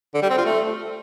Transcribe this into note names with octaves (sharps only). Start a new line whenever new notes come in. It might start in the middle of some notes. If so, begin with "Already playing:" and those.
D3
G3
C4
F4
A3